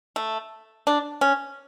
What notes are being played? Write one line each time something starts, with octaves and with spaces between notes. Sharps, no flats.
A3
D4
C#4